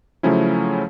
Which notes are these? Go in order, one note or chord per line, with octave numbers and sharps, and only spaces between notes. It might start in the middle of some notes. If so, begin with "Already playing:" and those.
C#3 F3 F#3 A3 C#4 E4